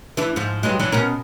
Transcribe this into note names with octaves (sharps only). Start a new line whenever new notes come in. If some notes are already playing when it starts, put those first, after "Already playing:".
E3 D4 E4
G#2 F3
G2 F#3 G#3
E3 F#3 D4
B2 C#4 A#4